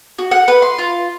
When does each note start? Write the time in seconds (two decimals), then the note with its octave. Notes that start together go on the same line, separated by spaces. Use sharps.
0.19 F#4
0.31 F#5
0.48 B4
0.62 C6
0.78 F4